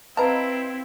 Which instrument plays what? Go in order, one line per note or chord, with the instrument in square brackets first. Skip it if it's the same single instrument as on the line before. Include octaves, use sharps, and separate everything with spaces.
[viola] C4 E4 [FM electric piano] B4 D#5 F5 [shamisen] A5 A#5